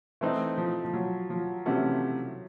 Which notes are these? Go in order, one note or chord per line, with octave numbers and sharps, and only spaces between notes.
E3 A3 C4 D#4
F3
F3
F#3
F3
C3 E3 A3 C#4 F#4